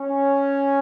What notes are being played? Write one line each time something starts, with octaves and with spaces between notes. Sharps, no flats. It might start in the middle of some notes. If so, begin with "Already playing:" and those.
Already playing: C#4